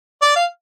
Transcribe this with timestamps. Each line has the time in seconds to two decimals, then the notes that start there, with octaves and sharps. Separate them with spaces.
0.21 D5
0.35 F5